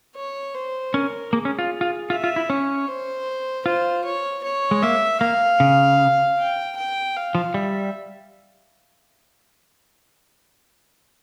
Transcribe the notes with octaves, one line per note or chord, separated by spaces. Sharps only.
C#5
C5
C#4 A#4
A#3 G#4
C#4
F4
F4
F4 E5
F4
E4
C#4 C#5
C5
F4 C5
C#5
C#5
G#3
A#3 E5
A#3 F5
C#3
G5
G5
F5
F3
G3 E5